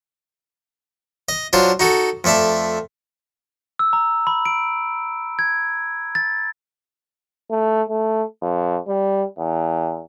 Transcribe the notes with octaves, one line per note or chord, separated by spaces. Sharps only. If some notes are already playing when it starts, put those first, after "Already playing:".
D#5
F#3 D4 F4 C5
D#4 F#4 A4
F2 A3 D5 E5 A5
E6
A#5
B5
D7
G#6
A6
A3
A3
F2
G3
E2